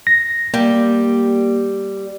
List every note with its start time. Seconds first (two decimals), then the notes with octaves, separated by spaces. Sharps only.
0.07 A#6
0.54 G3 A#3